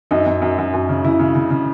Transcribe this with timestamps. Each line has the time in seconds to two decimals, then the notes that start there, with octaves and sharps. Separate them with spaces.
0.11 F#2 D#4
0.26 F#2
0.42 F#2
0.58 F#2
0.74 F#2
0.89 C#3
1.04 C#3 E4
1.19 C#3
1.35 C#3
1.50 C#3